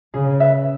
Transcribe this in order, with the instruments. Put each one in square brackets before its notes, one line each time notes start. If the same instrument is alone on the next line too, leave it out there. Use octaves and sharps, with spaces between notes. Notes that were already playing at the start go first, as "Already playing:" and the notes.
[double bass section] C#3 [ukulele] G#4
[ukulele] B4 E5